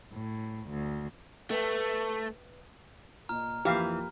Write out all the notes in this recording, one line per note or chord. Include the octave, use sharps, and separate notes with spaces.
A2
D2
A3 B4 E5 G5
A#2 D#5 A#5 F6
F2 E3 A#3 G4 F5